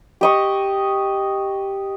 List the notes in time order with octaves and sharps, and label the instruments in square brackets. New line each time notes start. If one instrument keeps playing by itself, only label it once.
[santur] G4 D#5 C#6